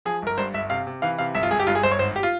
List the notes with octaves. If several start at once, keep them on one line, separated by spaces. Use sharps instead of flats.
F3 G#4
G1 A#4
G2 C5
G1 E5
C3 F5
C3
E3 F5
C3 F5
G1 E5
F4
G1 G#4
G4
G2 F4
G#4
G1 C5
C#5
G#1 C5
G4
F4